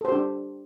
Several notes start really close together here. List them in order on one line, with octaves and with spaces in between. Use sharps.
A4 C5 G4 D4